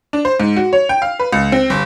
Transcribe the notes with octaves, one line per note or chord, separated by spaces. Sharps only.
D4
C5
G#2
F#4
C#5
G5
F5
B4
C#2
C4
G1